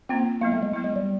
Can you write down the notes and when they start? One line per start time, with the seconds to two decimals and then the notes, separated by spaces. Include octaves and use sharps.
0.09 A#3 C4 C#4 F4
0.41 F#3 A#3 B3 E4
0.52 A3
0.63 G#3
0.73 F#3 B3 E4
0.84 G#3
0.96 G3